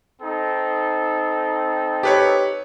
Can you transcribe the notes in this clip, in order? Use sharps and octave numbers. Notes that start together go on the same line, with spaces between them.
C4 D#4 A4
G4 B4 C#5